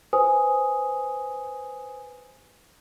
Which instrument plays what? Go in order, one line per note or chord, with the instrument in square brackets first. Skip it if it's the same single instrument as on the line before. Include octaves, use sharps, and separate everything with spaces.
[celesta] B4 C5 G#5 D#6